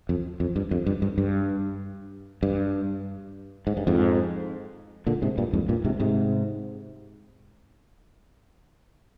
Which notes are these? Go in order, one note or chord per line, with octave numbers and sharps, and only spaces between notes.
F2
F2
G2
F2
G2
G2
G2
G2
G#2
G2
F2 G#2
A#2 D3
G#2 C3
G2 A#2
F2 G#2
G2 A#2
G#2 C3
G#2 C3